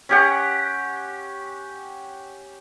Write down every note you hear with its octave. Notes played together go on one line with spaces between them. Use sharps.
C#4 G4 F#5